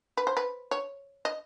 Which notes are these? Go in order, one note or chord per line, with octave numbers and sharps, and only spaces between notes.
B4
C5
B4
C#5
D#5